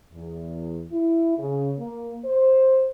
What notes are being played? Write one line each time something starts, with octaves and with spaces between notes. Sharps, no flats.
E2
E4
C#3
A#3
C5